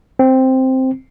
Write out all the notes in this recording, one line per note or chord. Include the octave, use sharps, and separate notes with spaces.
C4